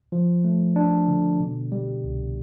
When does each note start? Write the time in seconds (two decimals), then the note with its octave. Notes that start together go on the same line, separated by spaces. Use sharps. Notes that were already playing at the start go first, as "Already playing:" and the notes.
0.12 F3
0.44 A3
0.76 D4
1.08 D3
1.40 B2
1.72 G3
2.04 C2